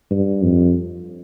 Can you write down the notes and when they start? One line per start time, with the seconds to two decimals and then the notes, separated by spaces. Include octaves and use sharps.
0.11 G2
0.44 F2